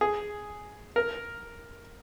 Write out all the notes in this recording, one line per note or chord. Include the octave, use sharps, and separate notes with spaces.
G#4
A#4